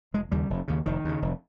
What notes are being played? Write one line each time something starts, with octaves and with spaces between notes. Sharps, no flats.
F1 G#3
D#2 C#3 G3
F1
D#2 C#3
F1 D#3
D#2 C#3
F1